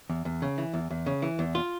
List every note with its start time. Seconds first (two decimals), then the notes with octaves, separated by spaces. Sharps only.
0.10 E2
0.25 E2
0.42 C#3
0.58 E3
0.74 E2
0.90 E2
1.06 C#3
1.22 E3
1.39 E2
1.55 F4